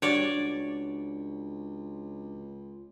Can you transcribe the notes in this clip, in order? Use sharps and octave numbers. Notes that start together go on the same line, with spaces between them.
G2 D4 F#4 C#5 D5
C#2